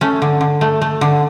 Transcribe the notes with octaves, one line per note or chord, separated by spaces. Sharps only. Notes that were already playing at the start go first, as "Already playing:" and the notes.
A3 C#4
D3
D3
A3
A3
D3